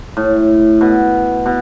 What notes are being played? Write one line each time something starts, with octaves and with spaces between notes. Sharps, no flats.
A2
B2
B2